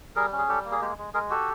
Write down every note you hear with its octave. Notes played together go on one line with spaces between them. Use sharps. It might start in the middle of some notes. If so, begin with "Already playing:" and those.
G3 G#4 A#4
C#4
G#4
G3 G4 A4
A#3
G#4
G#3 G4
G#3
G#3 G#4 A#4
F#4 G4 A4